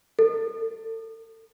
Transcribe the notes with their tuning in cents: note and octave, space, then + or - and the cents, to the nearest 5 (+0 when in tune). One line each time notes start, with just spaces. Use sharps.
A4 +35